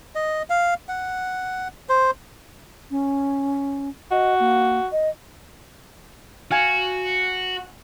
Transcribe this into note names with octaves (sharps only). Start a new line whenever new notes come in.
D#5
F5
F#5
C5
C#4
F#4 D#5
A#3
D#5
F#4 F5 G#5